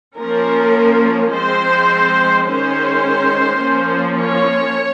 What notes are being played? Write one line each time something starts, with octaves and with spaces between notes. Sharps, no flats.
F3 A#3 C#4 A#4
F3 G#3 C4 C5
D#3 G#3 C#4 C5
F3 A#3 C#4
C#5